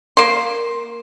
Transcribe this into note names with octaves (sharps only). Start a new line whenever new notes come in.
A#3 C6